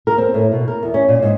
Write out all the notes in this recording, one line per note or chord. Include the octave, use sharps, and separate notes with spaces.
A#4
C4
A2
B2
A#4
E2
C#4
A#2
G#2